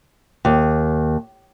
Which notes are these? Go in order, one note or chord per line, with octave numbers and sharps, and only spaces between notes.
D#2